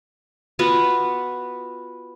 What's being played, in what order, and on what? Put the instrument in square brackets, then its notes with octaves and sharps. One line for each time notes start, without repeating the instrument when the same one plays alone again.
[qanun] B3 F4 F#4 B4